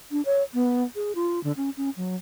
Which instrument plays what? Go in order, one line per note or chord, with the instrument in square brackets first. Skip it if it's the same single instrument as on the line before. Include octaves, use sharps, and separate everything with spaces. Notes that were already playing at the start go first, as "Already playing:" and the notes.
[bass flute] D4
C#5
B3
G#4
F4
D3
C#4
C#4
F#3